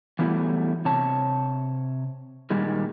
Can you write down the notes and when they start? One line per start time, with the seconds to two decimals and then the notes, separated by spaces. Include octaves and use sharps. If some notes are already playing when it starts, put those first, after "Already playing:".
0.19 E3 F#3 G3 A3 B3 E4
0.85 C3 C#5 A5
2.50 A#2 D#3 G3 G#3